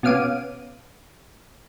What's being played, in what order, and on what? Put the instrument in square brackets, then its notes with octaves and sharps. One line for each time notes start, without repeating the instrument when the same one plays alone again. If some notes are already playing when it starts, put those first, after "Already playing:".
[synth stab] B2 B3 C#4 F5 D6 D#7